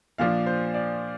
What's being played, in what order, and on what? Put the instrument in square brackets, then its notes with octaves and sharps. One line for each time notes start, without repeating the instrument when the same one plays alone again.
[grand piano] A#2 F3 D4 F5
C5
D5